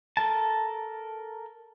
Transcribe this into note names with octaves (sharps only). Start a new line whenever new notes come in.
A4 A#4 A5